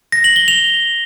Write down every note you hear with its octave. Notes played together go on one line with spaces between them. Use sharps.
A#6
F#7
G7
F7